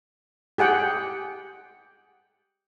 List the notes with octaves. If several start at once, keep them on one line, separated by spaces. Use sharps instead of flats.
G4 G#4 F#5 G5